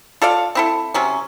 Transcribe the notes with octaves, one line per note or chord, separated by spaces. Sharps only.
F4 A4 D5 F5
C4 E4 A4
C3 F#3 C#4